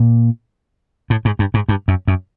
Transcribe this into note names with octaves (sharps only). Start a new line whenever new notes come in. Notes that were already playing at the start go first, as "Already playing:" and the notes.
Already playing: A#2
A2
G#2
G2
G#2
G2
F#2
F#2